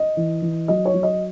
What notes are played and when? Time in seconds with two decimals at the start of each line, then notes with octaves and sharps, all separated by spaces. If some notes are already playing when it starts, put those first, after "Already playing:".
Already playing: D#5
0.17 E3
0.42 E3
0.68 F#3 D#5
0.85 C#5
0.94 F#3
1.03 D#5